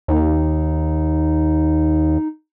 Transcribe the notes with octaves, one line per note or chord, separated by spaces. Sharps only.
D#2 D#4